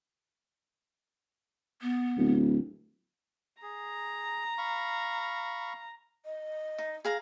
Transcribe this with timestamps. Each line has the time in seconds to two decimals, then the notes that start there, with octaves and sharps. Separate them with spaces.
1.82 B3
2.17 D1
3.62 G#4 A#5
4.58 F5 B5 C#6
6.26 D#5
6.78 D#4
7.05 G#4 F5 A#5